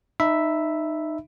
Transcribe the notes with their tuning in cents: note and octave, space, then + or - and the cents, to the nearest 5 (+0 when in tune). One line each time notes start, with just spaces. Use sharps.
D#4 -20 E5 +0 B5 +0